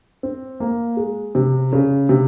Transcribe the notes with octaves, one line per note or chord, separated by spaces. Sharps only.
C4
A#3
G#3
C3
C#3
C3